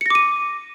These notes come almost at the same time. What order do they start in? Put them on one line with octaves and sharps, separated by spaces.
C#7 A#6 D6 D#7